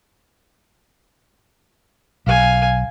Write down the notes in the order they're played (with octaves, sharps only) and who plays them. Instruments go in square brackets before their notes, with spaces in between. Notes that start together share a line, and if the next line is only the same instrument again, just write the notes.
[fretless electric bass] B1 [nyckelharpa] F5 G#5